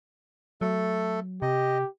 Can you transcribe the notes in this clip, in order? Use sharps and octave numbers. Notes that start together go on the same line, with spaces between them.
F#3 A3 A4
C3 G4 D#5